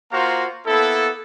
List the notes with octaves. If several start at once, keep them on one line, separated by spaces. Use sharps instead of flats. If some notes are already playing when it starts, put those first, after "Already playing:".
A#3 F4 F#4 C5 F5 A#5
A#3 B3 E4 A4